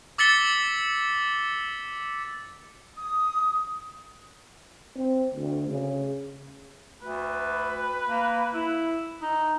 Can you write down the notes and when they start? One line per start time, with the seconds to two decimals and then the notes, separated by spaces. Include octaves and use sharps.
0.18 D6 E6 A6 B6 C#7 G7
2.95 D#6
4.96 C4
5.35 D2
5.69 C#3
7.02 D2 B4
8.06 A#3
8.54 E4
9.22 D#4